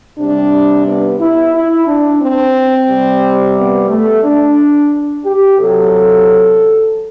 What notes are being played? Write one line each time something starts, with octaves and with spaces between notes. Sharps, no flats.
C3 G3 D4
B3
E4
E4
D4
C4
C3 G3
B3
A3
D4
G4
C3 F#3 A4